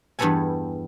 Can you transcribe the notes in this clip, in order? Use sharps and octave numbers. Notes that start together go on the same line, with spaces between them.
E2 G2 G3 B3 A4 G#5